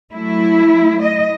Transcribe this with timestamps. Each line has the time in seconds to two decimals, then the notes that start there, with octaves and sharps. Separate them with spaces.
0.12 F#3 A3 E4
1.02 D#5